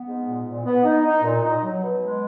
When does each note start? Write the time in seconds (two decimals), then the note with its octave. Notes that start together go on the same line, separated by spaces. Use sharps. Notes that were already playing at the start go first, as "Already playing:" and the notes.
Already playing: B3
0.08 G#2
0.27 A#2
0.47 A#2
0.66 B3
0.84 D#4
1.05 D#4
1.23 A#2
1.43 D#4
1.63 F#3
1.83 B2
2.01 G#3